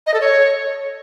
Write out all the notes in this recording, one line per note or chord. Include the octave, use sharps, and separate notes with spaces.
D#5
A4
C#5